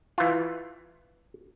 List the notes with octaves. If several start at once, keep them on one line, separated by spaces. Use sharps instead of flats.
E3 F4